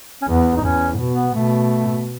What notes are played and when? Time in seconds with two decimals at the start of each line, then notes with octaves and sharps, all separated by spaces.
0.22 C#4
0.28 E2 B3
0.56 D#4
0.63 E2 C#4
0.98 B2
1.11 B3
1.34 B2 A3